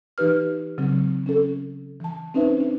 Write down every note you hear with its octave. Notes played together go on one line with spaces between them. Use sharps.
E3 D#4 G4 B4 F6
C#3 F#3 C4
C#4 A4
E3 A5
C4 C#4 D#4 B4 C5 E5
D4